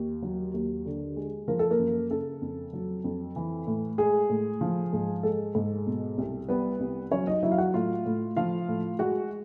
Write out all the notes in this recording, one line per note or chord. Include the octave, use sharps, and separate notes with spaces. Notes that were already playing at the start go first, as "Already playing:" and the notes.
Already playing: D#2
F#3
D#2
D3
G#3
F3 A#4
A4
A#3 A#4
F#2
C#3 A4
F2
F#3
F2
E3
A2
G#3 G#4
A2
F3
G#2
G#3 A4
G#2
B2
C2
G3 B3 B4
C2
F#3 C#4 C#5
D#4 D#5
F#3 E4 E5
F5
F#4 F#5
A2 F4 F5
A2
F3 F4 F5
A2
G#3 F#4 F#5